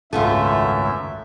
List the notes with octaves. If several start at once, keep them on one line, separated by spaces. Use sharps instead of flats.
G#1 C#2 F#2 A3 B3 F4 E5